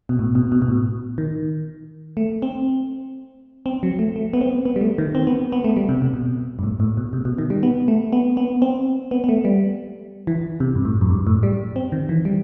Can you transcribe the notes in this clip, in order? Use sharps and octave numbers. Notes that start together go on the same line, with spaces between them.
B2
A2
B2
B2
B2
A2
D#3
A3
C4
C4
F#3
A3
A3
B3
C4
B3
G3
A3
D#3
C4
B3
B3
A3
G3
C3
C3
B2
G2
A2
A2
B2
C3
B2
D#3
G3
B3
A3
B3
B3
C4
B3
B3
A3
G3
E3
C3
G2
A2
F#2
G2
A2
G3
C4
D#3
E3
G3